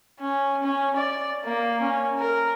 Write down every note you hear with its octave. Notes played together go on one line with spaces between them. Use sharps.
C#4
C#4
D5
A#3
C#4
A#4